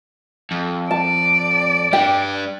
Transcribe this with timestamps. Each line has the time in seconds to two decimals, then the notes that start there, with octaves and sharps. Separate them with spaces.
0.51 F2
0.91 D5 A5
1.93 G3 D4 G5